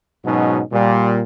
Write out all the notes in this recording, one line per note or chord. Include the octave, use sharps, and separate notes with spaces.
G#2 B2 F#3 C#4 D#4
A#2 G3